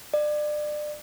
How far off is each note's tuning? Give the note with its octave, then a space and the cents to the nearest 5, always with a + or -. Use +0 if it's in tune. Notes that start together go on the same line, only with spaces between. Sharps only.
D5 +30